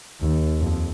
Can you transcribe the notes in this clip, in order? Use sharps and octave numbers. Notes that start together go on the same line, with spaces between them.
D#2
F2